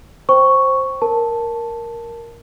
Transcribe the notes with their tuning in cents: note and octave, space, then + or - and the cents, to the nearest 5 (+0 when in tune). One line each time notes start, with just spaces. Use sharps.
C5 +10 G5 +0 C#6 +0
A#4 +0 A5 +0